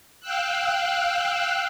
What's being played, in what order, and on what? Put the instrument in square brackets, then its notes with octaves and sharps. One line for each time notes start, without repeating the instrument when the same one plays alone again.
[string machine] F5 G5 E6 F#6